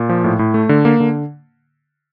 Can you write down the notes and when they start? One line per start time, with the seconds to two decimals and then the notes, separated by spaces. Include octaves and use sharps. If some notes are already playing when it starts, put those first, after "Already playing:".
Already playing: A#2
0.09 F3
0.24 A2
0.39 A2
0.54 A3
0.69 D3
0.85 A#3
1.00 D3